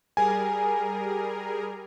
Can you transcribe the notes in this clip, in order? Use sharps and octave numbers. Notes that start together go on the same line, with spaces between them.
G3 G#4 A#4 G#5